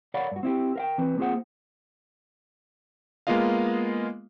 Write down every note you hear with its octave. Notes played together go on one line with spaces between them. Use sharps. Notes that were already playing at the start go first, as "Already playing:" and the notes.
A#4 C#5 D5 F5 F#5 B5
G2 F#4
C4 E4 G4
A#4 F5 G5
E3 C4 B4
A#3 C4 F4 G#4 C5 F#5
G#3 A#3 B3 F4 D#5 F5